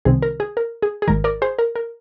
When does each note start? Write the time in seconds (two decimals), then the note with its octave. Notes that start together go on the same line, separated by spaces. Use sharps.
0.05 C2 C3 D#3 G3 C4 G#4
0.22 A#4
0.40 G#4
0.57 A#4
0.82 G#4
1.02 G#4
1.08 G#1 G#2 D#3 A#4
1.24 A#4 D5
1.42 G#4 C5
1.59 A#4
1.76 A#4